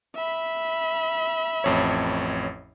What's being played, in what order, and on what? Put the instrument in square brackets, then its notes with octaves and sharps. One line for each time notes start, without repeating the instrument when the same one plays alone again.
[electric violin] E5 B5
[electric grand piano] A1 F2 C#5